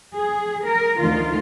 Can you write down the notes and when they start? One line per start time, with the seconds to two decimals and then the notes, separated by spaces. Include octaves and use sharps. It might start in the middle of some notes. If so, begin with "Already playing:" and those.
0.14 G#4
0.65 A#4
0.99 D2 D#3 F4